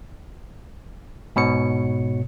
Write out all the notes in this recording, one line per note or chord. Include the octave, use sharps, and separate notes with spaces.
G#2 B2 C#5 C#7